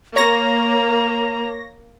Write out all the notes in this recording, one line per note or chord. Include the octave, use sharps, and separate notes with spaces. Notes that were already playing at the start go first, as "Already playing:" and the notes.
A#3 C#5 A#5 A#6